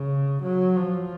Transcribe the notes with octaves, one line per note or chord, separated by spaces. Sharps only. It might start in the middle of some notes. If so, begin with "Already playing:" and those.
Already playing: C#3
F#3
F3